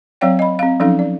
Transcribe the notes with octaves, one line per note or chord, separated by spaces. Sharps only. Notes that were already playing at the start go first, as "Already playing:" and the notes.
F#3 C4 C#5 D5 F5 G5
D#5 B5
C4 F5
F3 F#3 C#4 D#4 A4 F5
D5